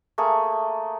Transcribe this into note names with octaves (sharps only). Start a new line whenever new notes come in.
A3 A#3 G#4